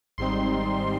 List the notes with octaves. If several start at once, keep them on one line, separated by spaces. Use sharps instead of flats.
G#1 G#2 G3 C4 D#4 C6